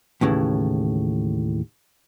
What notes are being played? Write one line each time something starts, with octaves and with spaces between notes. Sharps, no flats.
D#2 A2 C#3 E3